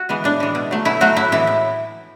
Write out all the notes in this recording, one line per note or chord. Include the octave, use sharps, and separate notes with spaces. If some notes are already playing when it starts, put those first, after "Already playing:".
Already playing: F#4
E3 G#3 B3
A2 D4
E3 G#3
B2
F#3 A3
B2 E4
F#3 A3 F#4
A2 E4
E3 G#3 E4
A2